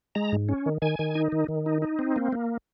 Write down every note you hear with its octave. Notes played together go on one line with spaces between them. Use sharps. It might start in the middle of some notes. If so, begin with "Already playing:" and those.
G#3 A#5
G#2
C#4
D#3
D#3 G#5
D#3
D#4
D#3
D#3
D#4
D#4
C4
A#3
A#3